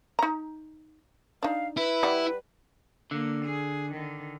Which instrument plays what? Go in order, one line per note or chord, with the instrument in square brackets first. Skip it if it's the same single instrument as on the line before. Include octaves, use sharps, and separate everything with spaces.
[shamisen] D#4 A#5
[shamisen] D4 D#4 [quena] F5
[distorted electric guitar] E4 [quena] B4
[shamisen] G3 D5 F#5
[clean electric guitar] D3 [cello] A#3
[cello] G#4
D3 D#3